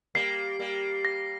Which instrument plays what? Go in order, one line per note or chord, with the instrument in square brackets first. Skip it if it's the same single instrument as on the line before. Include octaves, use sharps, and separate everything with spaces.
[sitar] G3 A#3 [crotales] C7
[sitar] G3 A#3
[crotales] A#6